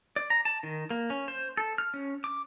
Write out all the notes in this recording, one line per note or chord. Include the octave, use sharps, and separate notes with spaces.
D5
A#5
A5
D#3
A#3
C#4
C5
A4
F6
C#4
D6